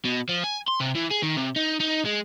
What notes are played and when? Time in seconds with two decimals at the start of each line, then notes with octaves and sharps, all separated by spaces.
0.05 B2
0.29 F3
0.44 G#5
0.68 C6
0.80 C3
0.95 E3
1.10 G#4
1.22 D#3
1.36 C3
1.56 D#4
1.80 D#4
2.06 G#3